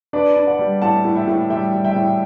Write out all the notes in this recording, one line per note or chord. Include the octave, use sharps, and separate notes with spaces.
D4 B4 D5
D4
D5 F#5
G3
A2 F#5 A5
A2
E5 G5
A2
G3 E5 G5
G3
E5 G5
A2